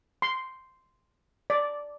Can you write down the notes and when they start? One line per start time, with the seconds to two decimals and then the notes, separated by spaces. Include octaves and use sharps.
0.22 C6
1.50 D5